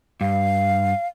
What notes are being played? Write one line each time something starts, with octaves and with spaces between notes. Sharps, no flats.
G2 F5